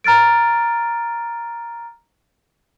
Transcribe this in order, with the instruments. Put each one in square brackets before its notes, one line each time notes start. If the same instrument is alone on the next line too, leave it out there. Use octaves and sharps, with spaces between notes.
[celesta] A#5 F6 A6 D7